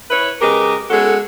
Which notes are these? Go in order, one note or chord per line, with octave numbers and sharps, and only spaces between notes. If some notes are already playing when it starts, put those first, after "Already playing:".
E4 B4 C#5
C#3 G#3 G4 A#4 B4 D#5
G#3 B3 C#4 F#4 A4